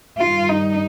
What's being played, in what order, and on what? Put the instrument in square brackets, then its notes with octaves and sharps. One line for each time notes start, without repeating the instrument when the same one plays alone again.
[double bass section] G2 D#3 G3 [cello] F4
[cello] D#4